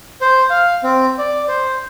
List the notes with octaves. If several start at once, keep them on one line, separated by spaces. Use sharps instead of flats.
C5
F5
C4
D5
C5